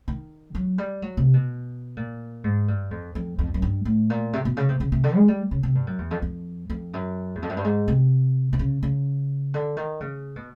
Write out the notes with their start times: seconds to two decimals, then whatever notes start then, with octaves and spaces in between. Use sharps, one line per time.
0.08 D#3
0.55 F#3
0.78 G3
1.02 F#3
1.17 C3
1.33 B2
1.97 A#2
2.44 G#2
2.68 G2
2.91 F2
3.15 F2
3.39 F2
3.54 F#2
3.62 G2
3.85 A2
4.10 A#2
4.33 C3
4.45 B2
4.57 C#3
4.69 C3
4.80 C#3
4.92 C3
5.04 D3
5.16 G#3
5.28 G3
5.51 C#3
5.63 C3
5.75 G2
5.87 F#2
5.98 E2
6.11 F2
6.22 F2
6.70 F2
6.93 F#2
7.35 E2
7.42 F2
7.49 F#2
7.57 G2
7.64 G#2
7.88 C3
8.53 C3
8.59 C#3
8.83 C#3
9.54 D3
9.77 D#3
10.00 C#3
10.36 B2